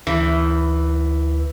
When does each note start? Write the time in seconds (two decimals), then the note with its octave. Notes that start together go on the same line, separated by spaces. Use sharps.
0.07 D2 E3